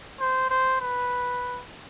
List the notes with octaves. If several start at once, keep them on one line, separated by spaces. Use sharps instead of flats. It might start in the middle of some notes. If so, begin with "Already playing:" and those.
C5
C5
B4